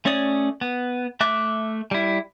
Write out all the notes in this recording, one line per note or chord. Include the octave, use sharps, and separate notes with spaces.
A3 C#4 C#5 D5 D#6
B3
A3 E5 D6 F#6
G3 E4